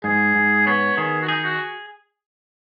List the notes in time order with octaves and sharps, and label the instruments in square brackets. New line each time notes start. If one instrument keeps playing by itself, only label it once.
[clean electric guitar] G#2 [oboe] G#4
[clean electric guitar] G#2
[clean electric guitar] B3 [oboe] C#5
[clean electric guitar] D#3 [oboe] G#4
[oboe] F#4
[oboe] D#4 [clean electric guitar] G#4
[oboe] F#4